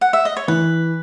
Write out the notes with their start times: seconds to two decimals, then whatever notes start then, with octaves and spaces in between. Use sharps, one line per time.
0.01 F#5
0.13 E5
0.25 D#5
0.37 C#5
0.48 E3 B4